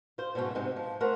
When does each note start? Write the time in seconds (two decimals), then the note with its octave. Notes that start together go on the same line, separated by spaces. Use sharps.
0.18 F4 C5
0.35 G#2 B2 F#3 A3 C#4
0.55 G#2 C3 G#3 C4 D#4
0.76 F3
1.00 A3 A#4 C5 E5 F#5